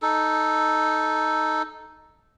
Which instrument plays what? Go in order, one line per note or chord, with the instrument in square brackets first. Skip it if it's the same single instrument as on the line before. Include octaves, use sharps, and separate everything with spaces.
[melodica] D#4 A4